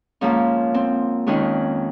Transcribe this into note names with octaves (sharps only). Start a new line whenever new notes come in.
G#2 F3 A#3 C#4
C4
F2 D#3 G#3 C#4